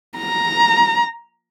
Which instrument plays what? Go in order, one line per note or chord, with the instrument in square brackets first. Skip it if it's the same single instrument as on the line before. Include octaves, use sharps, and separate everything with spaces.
[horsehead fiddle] A#5